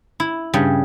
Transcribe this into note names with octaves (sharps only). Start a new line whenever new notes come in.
E4
G2 C#3 G3